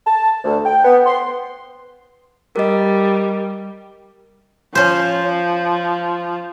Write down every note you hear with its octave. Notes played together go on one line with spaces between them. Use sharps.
A5
D2
G5
B3
C6
G3 A#4 D#5
F3 C#4 C5